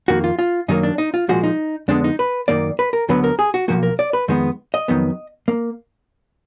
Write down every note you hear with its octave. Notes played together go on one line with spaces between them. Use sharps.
F2 D#3 A#3 F#4
F4
F4
F#2 D#3 F#3 A#3 D#4
D4
D#4
F4
A#2 F3 G#3 F#4
D#4
F2 D3 G#3 B3 D4
D#4
B4
F#2 D#3 A#3 D5
B4
A#4
D2 D3 F#3 B3 B4
A#4
G#4
F#4
B1 A#2 F3 A#3 F#4
A#4
D5
B4
F2 D#3 G#3 B3
D#5
F2 D#3 F#3 B3
A#3